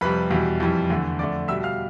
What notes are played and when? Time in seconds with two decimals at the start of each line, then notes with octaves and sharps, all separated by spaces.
0.01 F2 C3 G3 B4 B5
0.31 E2 B2 G3
0.60 F2 E3 G3
0.90 E2 D3 A3
1.19 F2 D3 A3 D5 D6
1.48 B2 G3 E5 E6
1.63 F5 F6